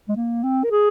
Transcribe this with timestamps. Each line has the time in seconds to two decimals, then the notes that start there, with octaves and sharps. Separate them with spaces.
0.08 G#3
0.16 A#3
0.44 C4
0.64 A#4
0.71 G#4